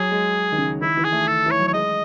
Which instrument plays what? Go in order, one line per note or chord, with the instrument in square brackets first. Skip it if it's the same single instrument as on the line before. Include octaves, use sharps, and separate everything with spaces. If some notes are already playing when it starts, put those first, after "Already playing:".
Already playing: [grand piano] F#3 [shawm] G#4
[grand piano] G#3
D#3
C#3
[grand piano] D#3 [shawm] E4
[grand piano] E3
[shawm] G#4
[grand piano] A3
[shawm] A4
[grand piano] E3 [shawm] C#5
[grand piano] F#3
[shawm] C#5
[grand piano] G#3 [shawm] D#5